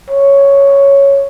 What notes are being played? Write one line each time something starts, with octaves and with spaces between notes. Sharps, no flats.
C#5